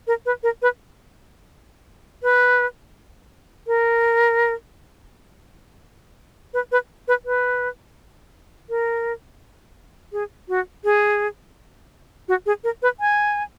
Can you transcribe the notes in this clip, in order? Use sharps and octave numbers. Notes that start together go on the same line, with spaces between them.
A#4
B4
A#4
B4
B4
A#4
B4
B4
B4
B4
A#4
G#4
F#4
G#4
F#4
G#4
A#4
B4
G#5